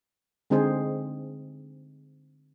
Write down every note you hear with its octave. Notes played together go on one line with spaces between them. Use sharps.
D3 G#3 C4 D#4 G#4 C5